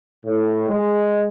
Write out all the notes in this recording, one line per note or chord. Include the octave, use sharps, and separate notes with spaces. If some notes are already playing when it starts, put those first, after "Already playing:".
A2
G#3